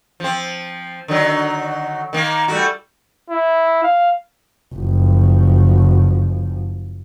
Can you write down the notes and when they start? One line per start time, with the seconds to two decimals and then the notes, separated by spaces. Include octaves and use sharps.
0.20 F3 C4
1.08 D3 D#3 F#3
2.13 D#3 A#3
2.48 G3 A3 F#4
3.30 E4
3.83 F5
4.75 F#1 F3